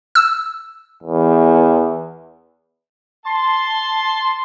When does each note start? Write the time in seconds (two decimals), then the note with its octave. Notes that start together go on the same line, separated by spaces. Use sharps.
0.15 E6
1.03 E2
3.25 A5 C6